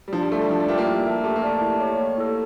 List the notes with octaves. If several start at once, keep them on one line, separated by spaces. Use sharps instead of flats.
G3
F3 D4
G3
A3 A4 D5
G3
F3 D4
G3
D4 F4 A#4 E5 G5
A#3
E4
A#4 E5 A5
A3 G4
A#3
A3 A#4 D5 A5
E4
G4 C#5
A#3
E4 A4